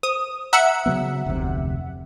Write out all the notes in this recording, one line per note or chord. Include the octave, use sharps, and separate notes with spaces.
C5 D#6
E5 F#5 A#5 E6
C#3 F#3 B3
F1 D2 C3